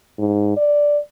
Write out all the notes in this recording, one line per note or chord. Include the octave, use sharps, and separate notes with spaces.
G#2
D5